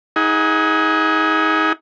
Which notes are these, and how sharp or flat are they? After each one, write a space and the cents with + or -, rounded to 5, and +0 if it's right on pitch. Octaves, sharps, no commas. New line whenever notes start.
D#4 +35 G#4 -5 F#5 +0